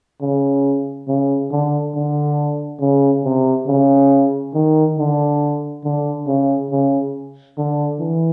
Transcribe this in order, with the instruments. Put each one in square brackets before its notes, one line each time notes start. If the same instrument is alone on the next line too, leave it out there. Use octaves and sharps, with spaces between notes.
[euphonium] C#3
C#3
D3
D3
C#3
C3
C#3
D#3
D3
D3
C#3
C#3
D3
E3